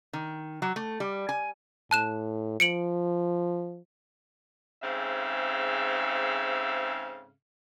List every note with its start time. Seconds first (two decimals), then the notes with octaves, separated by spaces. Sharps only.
0.13 D#3
0.62 F#3
0.76 A3
1.00 G3
1.29 G#5
1.91 A2 A5 F#6 E7
2.60 F3 C#7 D7 F#7
4.83 G#2 C#3 C4 A4 E5 F5